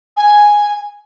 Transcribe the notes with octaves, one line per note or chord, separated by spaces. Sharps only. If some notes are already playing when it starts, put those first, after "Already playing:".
G#5